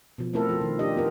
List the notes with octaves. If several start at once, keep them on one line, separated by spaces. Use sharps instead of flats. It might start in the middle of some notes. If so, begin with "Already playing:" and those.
B2 F3
A3 C4 E4 A4 A#4
F3 F4
D#3
D4 G4 D#5
B3 F4 A#4